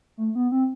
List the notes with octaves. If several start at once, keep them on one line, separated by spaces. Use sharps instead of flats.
A3
B3
C4